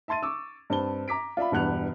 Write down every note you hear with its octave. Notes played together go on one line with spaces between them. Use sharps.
E5 A5 C6 A6 D#7
C#6 D6 E6
G2 C4 A5 G7
A#5 D6 B6 D7
F4 D5 E5 B5
E1 E2 G2 F#5 F#6 F7